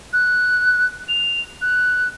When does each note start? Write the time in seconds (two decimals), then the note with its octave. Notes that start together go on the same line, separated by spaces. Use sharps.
0.13 F#6
1.09 F7
1.62 F#6